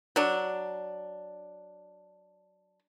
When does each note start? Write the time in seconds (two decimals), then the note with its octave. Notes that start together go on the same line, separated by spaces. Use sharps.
0.16 F#3 D4